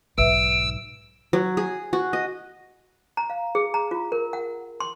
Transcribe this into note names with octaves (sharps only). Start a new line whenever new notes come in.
B1 G#2 B4 E5 E6 D7
F#3
G#4
F#4
D#5
A#5
F5
G#4
A#5
F4
A#4
F#5
C6